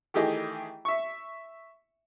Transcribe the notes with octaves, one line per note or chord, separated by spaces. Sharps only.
D#3 E3 A3 G4 G#4 D#5
E5 C#6